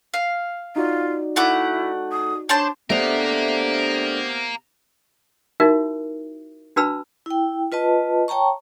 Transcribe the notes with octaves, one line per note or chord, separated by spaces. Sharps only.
F5
D#4 F4 F#4 D5
A3 E4 F#5 D6
D#6
D4 C5 C#5 A5
C3 A3 B3 D4 G4 A#4 F5
D#4 E4 F#4 A#4 E5
D4 F#4 B4 A5 B5 E6
E4 G5
F4 B4 D#5 A5
C#5 G5 A5 A#5 C#6